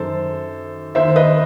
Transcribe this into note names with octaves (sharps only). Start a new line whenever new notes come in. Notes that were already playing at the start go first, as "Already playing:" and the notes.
Already playing: F#2 D#3 A4 C5
D#2 D#3 C5 E5
B4 D#5